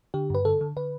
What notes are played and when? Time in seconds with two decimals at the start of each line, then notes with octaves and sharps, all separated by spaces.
0.14 D3 G4
0.30 G2 B4
0.45 D3 A4
0.61 D3
0.77 D3 B4